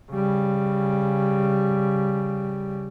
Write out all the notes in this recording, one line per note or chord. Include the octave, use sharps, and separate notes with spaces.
C#3 G3